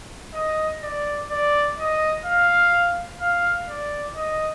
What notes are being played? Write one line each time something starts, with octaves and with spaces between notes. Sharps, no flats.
D#5
D5
D5
D#5
F5
F5
D5
D#5